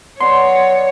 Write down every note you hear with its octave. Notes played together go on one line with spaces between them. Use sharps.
F#3 B3 C#5 D5 C6